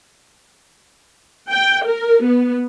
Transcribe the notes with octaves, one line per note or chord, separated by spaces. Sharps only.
G5
A#4
B3